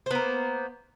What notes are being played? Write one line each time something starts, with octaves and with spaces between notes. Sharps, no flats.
A#3 B3 C5